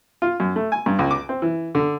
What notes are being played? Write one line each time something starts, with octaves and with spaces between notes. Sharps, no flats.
F4
F#2
A3
G#5
G2
C#2
D6
C4
E3
D3